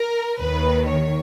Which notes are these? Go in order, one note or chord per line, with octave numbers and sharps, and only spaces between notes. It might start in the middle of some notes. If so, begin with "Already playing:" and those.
Already playing: A#4
D#2 D#3 B4
C#5